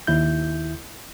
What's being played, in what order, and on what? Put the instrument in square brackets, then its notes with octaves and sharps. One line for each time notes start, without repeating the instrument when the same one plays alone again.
[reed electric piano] D#2 E4 G6